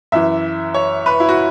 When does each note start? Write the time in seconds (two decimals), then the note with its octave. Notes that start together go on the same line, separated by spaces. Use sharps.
0.12 F#2 E3 E5
0.74 C#5
1.06 B4
1.20 E4
1.29 F#4